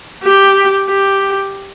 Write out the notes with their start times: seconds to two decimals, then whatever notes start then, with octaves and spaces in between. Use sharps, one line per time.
0.24 G4
0.88 G4